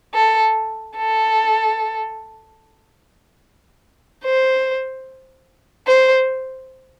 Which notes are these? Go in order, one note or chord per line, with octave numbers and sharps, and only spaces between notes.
A4
A4
C5
C5